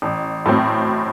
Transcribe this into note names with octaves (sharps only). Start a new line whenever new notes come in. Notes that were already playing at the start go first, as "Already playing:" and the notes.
A1
A2 F#3 C4